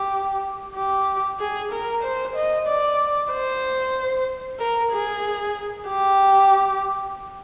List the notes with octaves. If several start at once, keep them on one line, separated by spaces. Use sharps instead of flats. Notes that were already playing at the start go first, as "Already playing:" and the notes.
Already playing: G4
G4
G#4
A#4
C5
D#5
D5
C5
A#4
G#4
G4